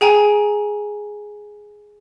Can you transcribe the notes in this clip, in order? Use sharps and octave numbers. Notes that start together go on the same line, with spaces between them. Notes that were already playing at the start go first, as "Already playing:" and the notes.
G#4 G5 G#5 A#5